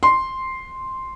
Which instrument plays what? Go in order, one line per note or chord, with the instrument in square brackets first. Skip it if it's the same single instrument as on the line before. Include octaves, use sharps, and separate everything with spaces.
[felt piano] C6